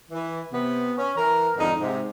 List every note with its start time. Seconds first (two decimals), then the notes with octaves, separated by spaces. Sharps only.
0.11 E3
0.52 C3 B3
0.96 C#4
1.16 E3 A#4
1.56 F2 G#2 D3 D#4
1.80 G#2 C3